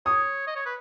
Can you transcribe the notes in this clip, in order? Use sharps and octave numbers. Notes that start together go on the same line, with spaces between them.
C#5 D#6
D#5
C#5
B4